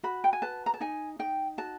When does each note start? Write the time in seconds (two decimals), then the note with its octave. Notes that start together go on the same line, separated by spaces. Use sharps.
0.03 F#4 B5
0.24 G5
0.33 G#5
0.42 B4 A5
0.66 A#5
0.74 A5
0.80 D#4 G#5
1.19 D#4 G5
1.58 F#4 A5